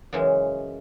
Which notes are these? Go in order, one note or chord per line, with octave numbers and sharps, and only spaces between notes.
F#2 C#3 E3 G#3